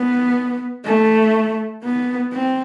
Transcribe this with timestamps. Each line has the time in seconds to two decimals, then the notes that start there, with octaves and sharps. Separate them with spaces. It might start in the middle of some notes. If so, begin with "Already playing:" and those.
Already playing: B3
0.85 A3
1.83 B3
2.33 C4